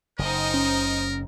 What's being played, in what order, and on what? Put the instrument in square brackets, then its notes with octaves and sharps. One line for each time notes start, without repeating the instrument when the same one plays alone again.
[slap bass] F#1 C#3 [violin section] D#4 C5 D#5 [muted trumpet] A#4
[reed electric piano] C#4